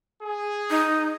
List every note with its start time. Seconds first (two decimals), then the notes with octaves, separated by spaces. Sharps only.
0.23 G#4
0.71 D#4